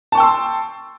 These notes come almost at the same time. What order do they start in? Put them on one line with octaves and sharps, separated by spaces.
A5 C#6 G5 E6 C6